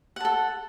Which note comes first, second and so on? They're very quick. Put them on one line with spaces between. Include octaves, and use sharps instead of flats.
F#5 A5 A4